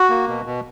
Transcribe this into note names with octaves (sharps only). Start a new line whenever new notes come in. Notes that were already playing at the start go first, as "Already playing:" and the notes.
Already playing: F#4
A#3
B2
B2